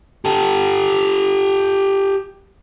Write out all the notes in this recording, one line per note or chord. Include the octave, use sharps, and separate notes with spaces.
G4 A4